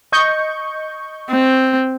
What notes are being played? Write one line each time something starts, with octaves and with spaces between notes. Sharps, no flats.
D#5 C#6 G6
C4